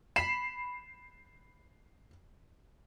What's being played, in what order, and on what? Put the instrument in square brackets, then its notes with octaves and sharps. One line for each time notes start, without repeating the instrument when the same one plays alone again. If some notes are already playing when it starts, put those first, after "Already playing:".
[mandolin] B5 [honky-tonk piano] C7 E7